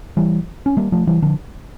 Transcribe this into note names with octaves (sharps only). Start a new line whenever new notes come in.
E3 G3
C#4
G3 A#3
F3 A3
E3 G3
D3 F3